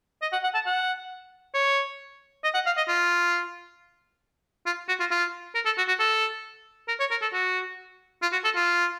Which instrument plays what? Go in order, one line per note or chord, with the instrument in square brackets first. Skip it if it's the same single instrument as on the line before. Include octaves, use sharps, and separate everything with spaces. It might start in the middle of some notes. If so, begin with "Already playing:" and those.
[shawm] D#5
F#5
F#5
A5
F#5
C#5
D#5
F#5
F5
D#5
F4
F4
F#4
F4
F4
A#4
A4
F#4
F#4
A4
A#4
C#5
A#4
A4
F#4
F4
F#4
A4
F4